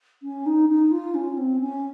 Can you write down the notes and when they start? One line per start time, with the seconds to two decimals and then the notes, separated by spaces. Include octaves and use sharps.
0.22 C#4
0.46 D#4
0.68 D#4
0.91 F4
1.14 C#4
1.37 C4
1.60 C#4